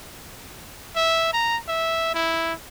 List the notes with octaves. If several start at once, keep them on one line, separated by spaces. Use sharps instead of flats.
E5
A#5
E5
E4